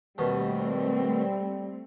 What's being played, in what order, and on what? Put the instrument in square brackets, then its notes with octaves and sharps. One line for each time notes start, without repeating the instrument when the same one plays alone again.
[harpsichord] D#2 B2 [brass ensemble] G3 [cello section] A3 C4